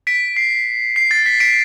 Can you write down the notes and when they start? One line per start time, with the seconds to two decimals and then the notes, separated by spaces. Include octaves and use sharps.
0.07 B6 D7
0.37 C7
0.96 C7
1.11 A6
1.26 B6
1.40 B6 D7